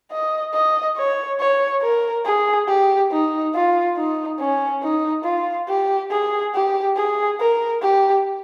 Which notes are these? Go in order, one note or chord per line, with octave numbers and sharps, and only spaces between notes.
D#5
D#5
C#5
C#5
A#4
G#4
G4
D#4
F4
D#4
C#4
D#4
F4
G4
G#4
G4
G#4
A#4
G4